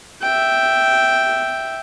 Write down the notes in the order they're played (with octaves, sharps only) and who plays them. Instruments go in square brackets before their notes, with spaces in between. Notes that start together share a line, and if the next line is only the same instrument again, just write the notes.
[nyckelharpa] E5 G5